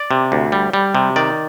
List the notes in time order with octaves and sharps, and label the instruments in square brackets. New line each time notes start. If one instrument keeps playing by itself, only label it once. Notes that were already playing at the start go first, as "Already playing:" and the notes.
Already playing: [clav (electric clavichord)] D5
C3
D2
G3
G3
C3
D#3 D5